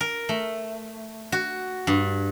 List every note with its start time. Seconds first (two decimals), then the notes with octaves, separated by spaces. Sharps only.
0.01 A#4
0.29 A3
1.32 F#4
1.87 G2